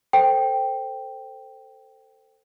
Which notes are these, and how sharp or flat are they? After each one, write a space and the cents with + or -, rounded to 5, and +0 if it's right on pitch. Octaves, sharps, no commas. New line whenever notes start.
A4 +20 C5 +0 G5 +0